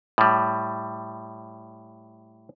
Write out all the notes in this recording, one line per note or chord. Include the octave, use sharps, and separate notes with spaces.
A2 G3